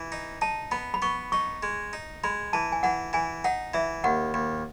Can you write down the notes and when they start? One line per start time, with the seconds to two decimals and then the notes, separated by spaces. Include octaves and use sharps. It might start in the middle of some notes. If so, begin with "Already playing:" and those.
Already playing: E3
0.12 D#4
0.41 D#4 A5
0.71 B3 B5
0.94 B5
1.02 B3 C#6
1.32 D#4 C#6
1.63 G#3
1.93 D#4
2.24 G#3 B5
2.53 E3 A5
2.72 G#5
2.83 E3 F#5
3.13 E3 G#5
3.44 D#4 F#5
3.74 E3 E5
4.04 D#2 F#5
4.34 D#2